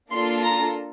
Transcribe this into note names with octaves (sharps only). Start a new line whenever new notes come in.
A#3 D4 F4 A4 C6
A#5